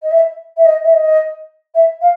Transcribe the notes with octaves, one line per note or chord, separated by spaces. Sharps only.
D#5
E5
E5
D#5
E5
D#5
E5
F5